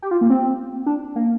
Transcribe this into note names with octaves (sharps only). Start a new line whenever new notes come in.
G4
F4
A#3
C4
D4
A#3